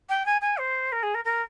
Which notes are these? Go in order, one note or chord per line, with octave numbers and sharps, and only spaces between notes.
G5
G#5
G#5
C5
A#4
G#4
A#4
A#4